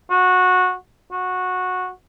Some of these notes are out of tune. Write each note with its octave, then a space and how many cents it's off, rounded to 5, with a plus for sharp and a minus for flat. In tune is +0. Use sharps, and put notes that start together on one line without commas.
F#4 -15
F#4 -15